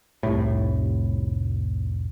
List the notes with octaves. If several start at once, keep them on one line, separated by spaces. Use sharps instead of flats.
F1 C2 A2